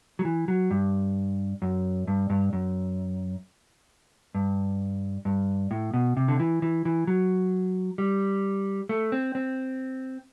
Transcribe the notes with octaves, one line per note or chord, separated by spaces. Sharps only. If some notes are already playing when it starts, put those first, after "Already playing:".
F#3
E3
F#3
G2
F#2
G2
G2
F#2
G2
G2
A2
B2
C3
D3
E3
E3
E3
F#3
G3
A3
C4
C4